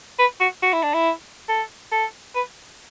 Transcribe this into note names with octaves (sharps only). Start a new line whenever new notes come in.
B4
F#4
F#4
E4
D4
E4
A4
A4
B4